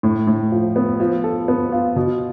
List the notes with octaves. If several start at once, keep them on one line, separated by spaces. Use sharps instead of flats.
A2
A2
F3
B3
F3
A4
B3
F4
B2